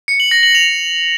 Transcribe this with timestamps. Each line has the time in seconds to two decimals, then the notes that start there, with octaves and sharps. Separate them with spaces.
0.08 C#7
0.20 F#7
0.31 A#6
0.43 F#7
0.55 F7